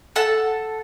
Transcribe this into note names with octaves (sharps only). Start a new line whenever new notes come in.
A4 F#5 A5